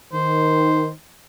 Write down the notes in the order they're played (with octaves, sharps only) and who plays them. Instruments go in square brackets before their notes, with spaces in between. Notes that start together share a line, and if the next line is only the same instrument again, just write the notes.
[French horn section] D#3 [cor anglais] C5